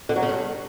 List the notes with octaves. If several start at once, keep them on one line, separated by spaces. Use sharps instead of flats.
D3
F#3
C#3
G2